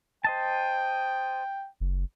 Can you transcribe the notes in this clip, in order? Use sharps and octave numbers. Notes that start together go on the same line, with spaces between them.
C5 D#5 G5 A5
F#1